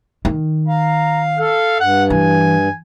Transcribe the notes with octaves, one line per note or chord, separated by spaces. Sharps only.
D#3
F5 A#5
A4 F5
G2 F#5
E3 G#5